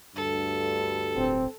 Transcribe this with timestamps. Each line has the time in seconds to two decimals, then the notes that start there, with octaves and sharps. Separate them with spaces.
0.16 D2 G2 A4
1.17 D1 C4